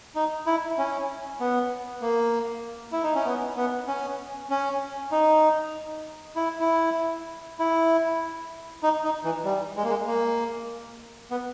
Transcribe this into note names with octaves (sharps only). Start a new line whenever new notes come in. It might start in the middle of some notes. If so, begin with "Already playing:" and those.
D#4
E4
C#4
B3
A#3
E4
D#4
C#4
B3
B3
C#4
C#4
D#4
E4
E4
E4
D#4
D#4
E3
G3
G#3
A#3
G#3
A#3
B3